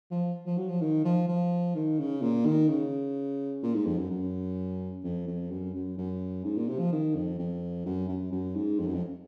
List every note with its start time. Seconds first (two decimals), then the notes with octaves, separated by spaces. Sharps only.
0.11 F3
0.46 F3
0.57 F#3
0.69 F3
0.81 D#3
1.05 F3
1.28 F3
1.75 D#3
1.99 C#3
2.22 A#2
2.46 D#3
2.69 C#3
3.63 A#2
3.74 G#2
3.86 F2
3.99 F#2
4.10 F#2
5.04 F2
5.27 F2
5.51 F#2
5.74 F#2
5.98 F#2
6.44 G#2
6.57 A#2
6.68 C3
6.80 F3
6.92 D#3
7.15 F2
7.39 F2
7.86 F#2
8.09 F#2
8.32 F#2
8.56 G#2
8.79 F2
8.87 F#2
8.94 F2